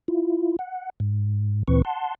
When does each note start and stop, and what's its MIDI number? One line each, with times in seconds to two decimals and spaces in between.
0.08 0.56 64
0.08 0.56 65
0.59 0.90 78
1.00 1.63 44
1.68 1.82 38
1.68 1.82 46
1.68 1.82 52
1.68 1.82 60
1.68 1.82 71
1.68 1.82 85
1.85 2.15 78
1.85 2.15 81
1.85 2.15 84